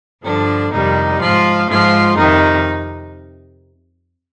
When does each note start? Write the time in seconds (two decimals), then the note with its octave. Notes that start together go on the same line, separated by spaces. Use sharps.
0.24 G2 D3 F3 D4
0.72 F2 C3 D#3 G3 D#4
1.21 G#2 F3 F4
1.69 G#2 F3 F4
2.17 F2 C3 D#3 D#4